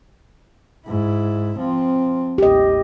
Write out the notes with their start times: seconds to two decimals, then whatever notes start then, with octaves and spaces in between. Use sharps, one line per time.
0.87 G#2 E4
1.58 F3 C4
2.38 A1 D#2 G4 D#5